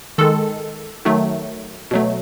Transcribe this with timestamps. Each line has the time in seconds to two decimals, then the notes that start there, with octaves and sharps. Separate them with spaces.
0.18 D#3 G#3 A4
1.05 D#3 F#3 A3
1.91 B2 F#3 A3